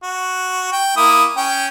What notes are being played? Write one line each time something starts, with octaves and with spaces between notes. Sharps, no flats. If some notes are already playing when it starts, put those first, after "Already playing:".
F#4
G5
A#3 E4 D#6
C#4 G5